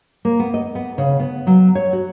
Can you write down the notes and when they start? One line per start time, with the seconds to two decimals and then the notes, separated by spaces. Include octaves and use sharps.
0.25 A#3
0.39 B3
0.54 D#5
0.75 B3
0.98 C#3
1.19 B3
1.47 F#3
1.75 C#5
1.93 F#4